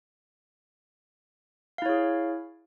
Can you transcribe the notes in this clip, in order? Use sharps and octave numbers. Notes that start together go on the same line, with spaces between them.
E4 G#4 C#5 F5